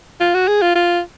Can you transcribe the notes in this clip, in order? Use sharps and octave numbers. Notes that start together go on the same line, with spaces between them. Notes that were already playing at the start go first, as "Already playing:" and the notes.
F4
F#4
G#4
F4
F4